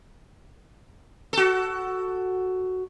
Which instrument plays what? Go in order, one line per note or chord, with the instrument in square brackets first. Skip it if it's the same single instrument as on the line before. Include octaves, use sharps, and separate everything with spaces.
[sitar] F#4 A4